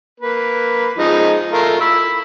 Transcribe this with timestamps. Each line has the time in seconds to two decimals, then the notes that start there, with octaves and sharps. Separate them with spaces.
0.20 A#3 B4
0.98 F3 G#3 D#4
1.53 A3 F4 A#4
1.81 B5 E6